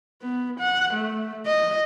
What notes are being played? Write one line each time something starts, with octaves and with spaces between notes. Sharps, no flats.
B3
F#5
A3
D#5